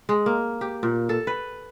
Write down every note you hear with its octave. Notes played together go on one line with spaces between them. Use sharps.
G#3
A#3
G4
A#2
A4
B4